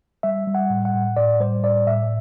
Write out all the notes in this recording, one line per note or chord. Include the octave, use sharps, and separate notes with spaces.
G3 E5
G3
F#5
A2
F#5
A2
A2 D5
G3 C5
A2 D5
A2 E5